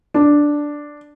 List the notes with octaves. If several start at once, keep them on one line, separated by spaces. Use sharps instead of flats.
D4